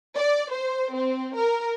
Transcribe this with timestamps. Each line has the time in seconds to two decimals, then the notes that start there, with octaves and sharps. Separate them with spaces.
0.16 D5
0.52 C5
0.94 C4
1.37 A#4